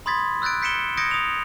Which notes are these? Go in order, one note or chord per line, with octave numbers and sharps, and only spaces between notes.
B5 C6 D#6 G#6 A6 B6
E6 F#6 G6 A6 D7
G6 B6 C#7 D7 E7 G7
D#6 G6 G#6 A#6 C#7 D7
D#6 F7